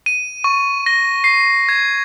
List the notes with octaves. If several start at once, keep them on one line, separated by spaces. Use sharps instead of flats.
D#7
C#6
A#6
C7
G#6